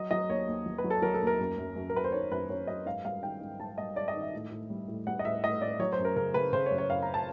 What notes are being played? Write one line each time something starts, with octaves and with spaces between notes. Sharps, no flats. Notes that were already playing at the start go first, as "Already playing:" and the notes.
Already playing: F#3 D#5
F#3 D#5
D#2 C#5
D#2
F#3
B4
F#3
A4
F#3 A#4
A4
D#2
A#4
F#2
F#2
F#2
A#4
F#2 B4
C5
D#3 C#5
F#2 B4
F#2 C#5
F#2 D#5
G#2 F5
G3 F5
D#3 G5
G#2
G#2 A5
G3 D#5
G#2 D5
D#5
D#3
E5
A2
A2
G3
A2
G3 F#5
D#5
A2 E5
A2 D#5
A2 D5
F#3 C#5
C5
F#2
A#4
C#3 A#4
C#3 B4
C#3 C5
C#5
F#2
C#5
F#2 F5
A#5
A5